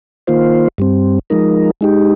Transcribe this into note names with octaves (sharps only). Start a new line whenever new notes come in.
D#3 A#3 F4 C5
G2 G3 C4
F3 G#3 D#4 A#4
G#3 D#4 G4